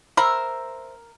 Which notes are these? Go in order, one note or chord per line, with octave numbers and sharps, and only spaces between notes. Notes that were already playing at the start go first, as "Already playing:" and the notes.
A#4 C5 E5 B5